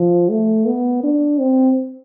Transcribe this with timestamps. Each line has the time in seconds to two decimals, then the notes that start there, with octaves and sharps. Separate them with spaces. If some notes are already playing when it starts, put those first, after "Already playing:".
Already playing: F3
0.31 A3
0.66 B3
1.04 D4
1.40 C4